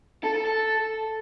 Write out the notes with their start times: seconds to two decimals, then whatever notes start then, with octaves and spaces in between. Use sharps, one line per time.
0.24 A4
0.35 A4
0.46 A4